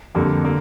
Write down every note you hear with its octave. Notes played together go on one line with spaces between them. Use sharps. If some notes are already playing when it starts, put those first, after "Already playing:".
F2 D3 G3 A#3
D3 A#3